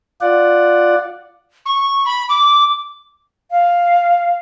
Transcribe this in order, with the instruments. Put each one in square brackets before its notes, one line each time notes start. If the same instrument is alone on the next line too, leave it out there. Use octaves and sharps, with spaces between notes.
[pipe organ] F4 D5 F#5
[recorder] C#6
B5
D6
[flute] F5